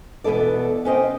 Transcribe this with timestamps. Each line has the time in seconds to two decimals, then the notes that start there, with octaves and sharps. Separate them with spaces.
0.24 E2 B2 B3 A4 D5
0.85 C#4 C5 D#5 G5